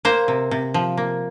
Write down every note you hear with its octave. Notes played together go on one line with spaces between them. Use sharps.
A#3 C5
C3
C3
F3
A#3